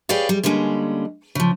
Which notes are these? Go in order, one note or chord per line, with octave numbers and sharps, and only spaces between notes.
G4 G#4 B4 C#5 D5 F5
G3
D3 G3 G#3 A#3 C#4
C#3 F3